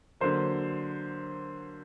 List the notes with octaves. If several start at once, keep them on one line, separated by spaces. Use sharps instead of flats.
D3 F#3 A#3 C5